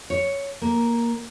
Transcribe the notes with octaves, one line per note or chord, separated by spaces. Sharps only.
C#5
A#3